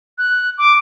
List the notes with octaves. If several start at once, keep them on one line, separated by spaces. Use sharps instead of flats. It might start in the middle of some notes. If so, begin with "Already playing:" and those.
F#6
D6